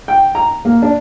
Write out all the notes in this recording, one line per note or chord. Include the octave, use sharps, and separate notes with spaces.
G5
A#5
A#3
D4